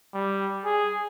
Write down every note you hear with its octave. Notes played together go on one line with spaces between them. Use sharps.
G3
G#4